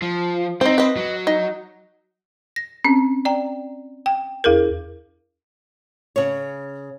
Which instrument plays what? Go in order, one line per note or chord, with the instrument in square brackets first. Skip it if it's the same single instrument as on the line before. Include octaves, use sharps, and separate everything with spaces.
[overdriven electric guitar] F3
[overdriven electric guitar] C4 [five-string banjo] D#4 C5
[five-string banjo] B4 D#5
[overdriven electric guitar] F#3
[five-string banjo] D#4
[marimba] A#6
C4 C#4
D5 G5 A#5
G5
E2 E4 G#4 A#4
[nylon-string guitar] C#3 C#5